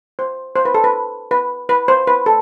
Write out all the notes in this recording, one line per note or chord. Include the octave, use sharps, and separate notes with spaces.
C5
C5
B4
A4
B4
B4
B4
C5
B4
A4